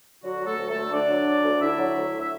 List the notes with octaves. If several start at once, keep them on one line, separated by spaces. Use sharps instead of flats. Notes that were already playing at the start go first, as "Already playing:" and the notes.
D3 F#3 F#4
F#3
A3 A4
D2
A3 A4
D2
D3 D4 D5
F#3
D2
D2
D3 E4 E5
F#3
D2
E5